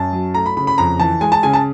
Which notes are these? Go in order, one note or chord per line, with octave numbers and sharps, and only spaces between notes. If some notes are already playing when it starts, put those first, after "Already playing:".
Already playing: F#2 A5
F#3
A3 A#5
B5
C#3 B5
B5
F2 A#5
E3 A5
G#3 G#5
A5
C#3 G#5
A5